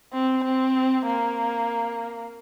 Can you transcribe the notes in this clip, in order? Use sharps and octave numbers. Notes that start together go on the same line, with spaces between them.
C4
C4
A#3